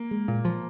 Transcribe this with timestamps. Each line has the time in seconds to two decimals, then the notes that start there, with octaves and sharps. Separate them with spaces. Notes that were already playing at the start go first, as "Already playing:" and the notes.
Already playing: A#3
0.11 G#3
0.28 A#2
0.45 F3